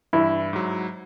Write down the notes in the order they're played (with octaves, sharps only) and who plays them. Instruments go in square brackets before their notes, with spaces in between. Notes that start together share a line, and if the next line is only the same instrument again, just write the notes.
[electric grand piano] G2 E3 [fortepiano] E4
[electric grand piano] G#2 F#3